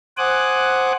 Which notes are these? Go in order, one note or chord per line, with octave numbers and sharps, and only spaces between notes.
C5 F#5 G#5 D6 D#6 F#6